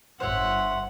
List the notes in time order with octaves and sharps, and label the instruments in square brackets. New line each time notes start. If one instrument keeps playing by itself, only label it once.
[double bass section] G1 [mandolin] C5 C#5 E5 [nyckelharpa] F#5